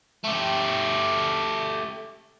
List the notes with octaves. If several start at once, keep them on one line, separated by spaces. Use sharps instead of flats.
A3 G4